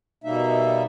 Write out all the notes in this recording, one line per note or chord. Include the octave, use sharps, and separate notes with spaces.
B2 G3 A#3 D#4 E5